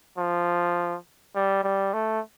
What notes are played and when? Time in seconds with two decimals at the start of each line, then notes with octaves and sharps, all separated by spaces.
0.18 F3
1.35 G3
1.64 G3
1.93 A3